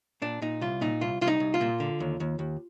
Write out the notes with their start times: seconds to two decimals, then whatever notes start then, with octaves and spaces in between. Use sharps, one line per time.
0.22 A#2 D4
0.42 A#2 D#4
0.61 C2 F4
0.81 A#2 D#4
1.01 C2 F4
1.21 C2 F4
1.27 D#4
1.40 C2
1.54 F4
1.61 A#2
1.80 D3
2.00 D#2
2.20 D#2
2.39 D#2